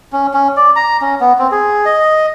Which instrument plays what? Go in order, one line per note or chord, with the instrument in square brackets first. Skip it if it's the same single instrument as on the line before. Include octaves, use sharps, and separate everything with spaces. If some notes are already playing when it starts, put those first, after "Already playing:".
[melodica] C#4
C#4
D5
A#5
C#4
B3
C4
G#4
D#5